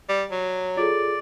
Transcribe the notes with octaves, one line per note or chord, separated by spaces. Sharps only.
G3
F#3
F4 G#4 A4 D5